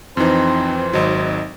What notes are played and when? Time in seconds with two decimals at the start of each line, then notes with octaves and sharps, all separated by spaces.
0.17 F2 E3 C4 D#4 C5
0.93 G#1 F#3 D#4 D#5